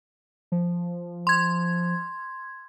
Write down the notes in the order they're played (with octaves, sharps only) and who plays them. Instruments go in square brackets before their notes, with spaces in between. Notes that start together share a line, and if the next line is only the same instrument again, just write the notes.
[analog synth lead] F3
[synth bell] C6 G#6